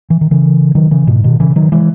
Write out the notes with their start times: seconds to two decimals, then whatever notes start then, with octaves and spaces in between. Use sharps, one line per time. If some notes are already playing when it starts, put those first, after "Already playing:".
0.10 E3
0.21 D#3
0.31 C#3 E3
0.75 D#3 F#3
0.91 C#3 E3
1.07 G#2 B2
1.24 B2 D#3
1.40 C#3 E3
1.56 D#3 F#3
1.72 E3 G#3